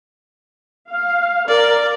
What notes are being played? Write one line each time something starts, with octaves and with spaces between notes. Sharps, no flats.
F5
A#4 D5